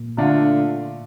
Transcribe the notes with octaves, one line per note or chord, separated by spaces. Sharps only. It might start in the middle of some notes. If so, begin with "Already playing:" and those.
Already playing: A#2
D3 A3 D4 F4